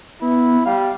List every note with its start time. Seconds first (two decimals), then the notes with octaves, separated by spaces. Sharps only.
0.21 B3 E4
0.65 G3 F5